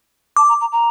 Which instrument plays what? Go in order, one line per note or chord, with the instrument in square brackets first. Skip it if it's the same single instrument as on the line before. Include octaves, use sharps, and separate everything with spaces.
[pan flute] A5 [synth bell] D6
[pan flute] A#5
A#5
A#5